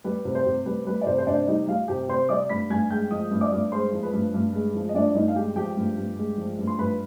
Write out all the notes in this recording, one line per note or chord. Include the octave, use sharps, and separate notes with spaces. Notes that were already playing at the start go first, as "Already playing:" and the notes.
G3 B4
C3
C5
C3
G3 B4
G3 B4
D5
C3 C5
C5
C3 D4 D5
G3 D#4 D#5
G3 F4 F5
C3 G4 G5
C3 C5 C6
G3 D5 D6
G2 B5 B6
G2 G#5 G#6
G#3 G5 G6
F3 D#5 D#6
G2
D5 D6
G2
G#3 C5 C6
F3
B4 B5
G2
G2
G#3
F3
D#5
G2 D4 D5
G2 D#4 D#5
F5
G#3 G4 G5
F3 G4 G5
G2
G2
G#3
F3
G2
C6
G2 B4 B5